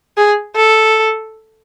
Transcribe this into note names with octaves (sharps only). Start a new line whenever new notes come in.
G#4
A4